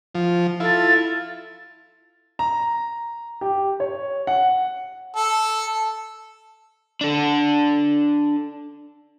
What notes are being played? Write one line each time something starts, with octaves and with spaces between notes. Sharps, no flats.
F3
E4 F4 A4
A#5
G4
C#5
F#5
A4
D4 A4